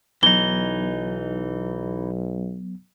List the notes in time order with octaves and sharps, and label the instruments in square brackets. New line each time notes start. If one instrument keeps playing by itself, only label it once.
[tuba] B1 [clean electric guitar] E3 D#4 [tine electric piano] F#3 B3 [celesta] G7